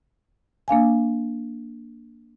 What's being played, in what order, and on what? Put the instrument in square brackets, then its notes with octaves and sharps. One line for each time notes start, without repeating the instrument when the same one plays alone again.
[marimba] A#3 D4 F5 G#5